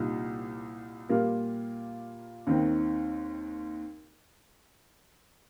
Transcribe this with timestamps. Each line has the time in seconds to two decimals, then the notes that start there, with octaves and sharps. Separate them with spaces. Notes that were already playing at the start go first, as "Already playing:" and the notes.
Already playing: C2 A#2 G3 D#4
1.09 A#2 G3 A#3 F4 A#4
2.47 D#2 D#3 C4